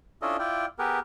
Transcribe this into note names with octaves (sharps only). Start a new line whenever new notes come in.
C#4 D4 E4 F4 A4 D#5
E4 F4 D5 G5
B3 G4 G#4 A#4 B4